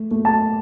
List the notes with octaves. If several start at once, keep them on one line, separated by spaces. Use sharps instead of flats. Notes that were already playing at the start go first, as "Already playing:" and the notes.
Already playing: A3
A3
A5